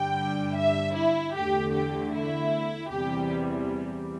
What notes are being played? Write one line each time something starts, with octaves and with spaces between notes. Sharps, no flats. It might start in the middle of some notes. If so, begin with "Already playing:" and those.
Already playing: G2 D3 G3 G5
E5
E4
E2 D3 A3 G4
G4
E4
E2 C3 E3 G3 G4